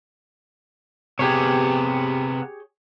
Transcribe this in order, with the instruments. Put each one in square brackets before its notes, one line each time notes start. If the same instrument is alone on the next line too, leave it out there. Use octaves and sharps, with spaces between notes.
[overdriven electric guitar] C3 B3 [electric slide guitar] G4 G#4 C#5